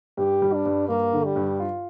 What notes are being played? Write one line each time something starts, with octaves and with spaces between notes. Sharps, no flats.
G2 G4
G3
D4
G2
G2 A#3
D3
G3
G2
F4